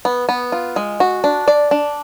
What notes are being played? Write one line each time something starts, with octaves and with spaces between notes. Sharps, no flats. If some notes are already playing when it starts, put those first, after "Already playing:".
B3
B3
F4
G#3
F#4
D4
D5
D4